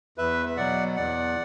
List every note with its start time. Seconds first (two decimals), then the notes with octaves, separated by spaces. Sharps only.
0.18 E2 B4 E5
0.46 E5
0.57 B2 F#3 D5 F#5
0.96 E2 D5 F#5